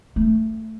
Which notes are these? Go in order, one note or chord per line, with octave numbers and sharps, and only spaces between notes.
A3